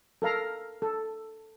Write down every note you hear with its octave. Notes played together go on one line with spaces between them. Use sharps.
A4 A#4 F5 A#5
A4